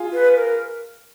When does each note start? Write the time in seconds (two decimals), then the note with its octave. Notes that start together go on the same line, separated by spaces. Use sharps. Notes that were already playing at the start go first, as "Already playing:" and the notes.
Already playing: F4 G#4
0.13 B4
0.36 A#4